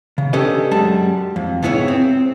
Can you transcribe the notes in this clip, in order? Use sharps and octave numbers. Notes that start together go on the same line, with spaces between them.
C#3
C#4 D4 G4 A4 B4 D#5
F#2 G3 G#3 A5
F2
C#2 G#2 B3 E4 G#4 C#5
C4